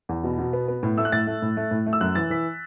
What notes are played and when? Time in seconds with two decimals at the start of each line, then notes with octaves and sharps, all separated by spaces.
0.09 E2
0.24 B2
0.38 B2
0.53 B3
0.68 B3
0.83 A2
0.98 A3 E6
1.05 F#6
1.12 A2 A6
1.27 A3
1.42 A2
1.57 A3
1.71 A2
1.86 A3
1.93 E6
2.01 F#2 F#6
2.15 E3 A6
2.30 E3 B6